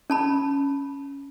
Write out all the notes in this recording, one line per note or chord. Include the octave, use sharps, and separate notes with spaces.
C#4 A5 B5